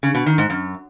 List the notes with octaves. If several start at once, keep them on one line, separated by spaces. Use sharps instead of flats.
C#3
B2
D#3
G#2
F#2